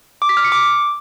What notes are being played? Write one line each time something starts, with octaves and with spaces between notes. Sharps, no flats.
D6
B6
F6
C#7
D6